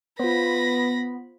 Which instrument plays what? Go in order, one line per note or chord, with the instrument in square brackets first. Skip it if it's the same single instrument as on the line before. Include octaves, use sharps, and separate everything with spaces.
[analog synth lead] B3 [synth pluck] F4 C5 [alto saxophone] B4 [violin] B5 A#6